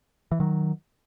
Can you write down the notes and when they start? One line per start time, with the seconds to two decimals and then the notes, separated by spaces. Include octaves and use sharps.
0.32 E3
0.40 D#3 F#3